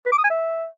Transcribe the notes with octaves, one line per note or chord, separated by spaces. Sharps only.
B4
D6
D#6
G#5
E5